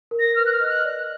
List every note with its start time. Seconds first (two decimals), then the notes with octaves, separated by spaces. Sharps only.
0.11 A#4
0.19 A#6
0.36 B4 F6
0.46 F#6
0.52 F6
0.60 D#5
0.69 F#6
0.85 D5